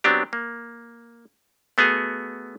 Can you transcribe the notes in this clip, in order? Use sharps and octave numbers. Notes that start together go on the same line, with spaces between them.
F#3 B3 C4 D4 G4
A#3
A3 B3 F#4 G#4